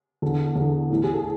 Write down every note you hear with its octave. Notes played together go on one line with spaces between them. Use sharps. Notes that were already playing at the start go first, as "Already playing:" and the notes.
E2 D3 A4
E2 D3
A2 E3
G#4
A4